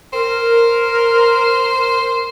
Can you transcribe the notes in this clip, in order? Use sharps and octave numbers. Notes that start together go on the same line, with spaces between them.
A#4 C5